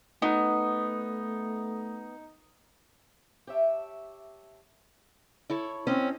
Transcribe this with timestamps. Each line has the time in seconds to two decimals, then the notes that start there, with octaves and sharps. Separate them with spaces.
0.22 A3 B3 D#4
3.47 G4 C#5 E5 A5
5.50 E4 A4 C#5
5.87 C4 C#4 C5 D#5